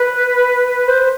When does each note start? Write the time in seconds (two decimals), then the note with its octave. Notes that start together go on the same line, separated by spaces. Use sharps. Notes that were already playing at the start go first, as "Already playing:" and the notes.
Already playing: B4
0.87 C5